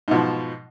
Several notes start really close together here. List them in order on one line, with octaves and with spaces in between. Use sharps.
G#2 B2 F3